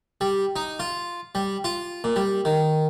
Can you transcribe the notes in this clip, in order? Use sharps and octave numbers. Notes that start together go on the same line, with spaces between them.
G3
D#4
F4
G3
F4
A#2
G3
D#3